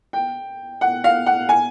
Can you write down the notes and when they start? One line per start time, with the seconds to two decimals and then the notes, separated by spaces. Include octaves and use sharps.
0.13 G5
0.81 F#5
1.04 F5
1.26 F#5
1.49 G#5